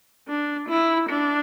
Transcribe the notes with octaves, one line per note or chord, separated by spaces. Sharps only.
D4
E4
D4